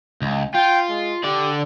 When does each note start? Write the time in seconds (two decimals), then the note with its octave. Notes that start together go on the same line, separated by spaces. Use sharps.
0.22 C#2
0.54 F4 G5
0.89 G#3
1.24 D3 G4 D5